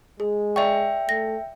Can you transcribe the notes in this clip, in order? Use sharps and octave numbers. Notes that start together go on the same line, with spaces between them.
G#3 G#4
D5 E5 G5 C#6
A3 A#6